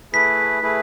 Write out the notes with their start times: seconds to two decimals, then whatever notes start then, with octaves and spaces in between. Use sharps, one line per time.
0.13 A3 E4 G#4 B4 B6
0.62 A3 E4 G#4 B4